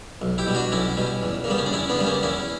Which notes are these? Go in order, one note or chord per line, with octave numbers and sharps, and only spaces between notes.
B1
E4 G4
B2 G3
D4 F#4
B1 C#4 E4
B2 G3
E2
A#3
C#3 G3 B3
C#4
D4
E2 C#4 E4
B3 D4
C#3 G3
A#3 C#4
E2 C#4 E4